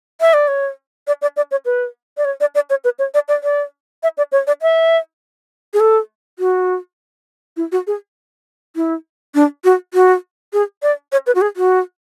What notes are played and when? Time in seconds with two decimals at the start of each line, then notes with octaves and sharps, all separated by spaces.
0.21 E5
0.33 D5
0.48 C#5
1.07 D5
1.22 D5
1.36 D5
1.51 C#5
1.65 B4
2.17 D5
2.25 C#5
2.40 D5
2.55 D5
2.70 C#5
2.84 B4
2.99 C#5
3.14 D5
3.28 D5
3.43 D5
4.03 E5
4.17 D5
4.32 C#5
4.47 D5
4.62 E5
5.74 G#4
5.80 A4
6.39 F#4
7.57 E4
7.72 F#4
7.87 G#4
8.76 E4
9.34 D4
9.64 F#4
9.94 F#4
10.53 G#4
10.82 D5
11.12 C#5
11.27 B4
11.35 F#4
11.41 G#4
11.56 F#4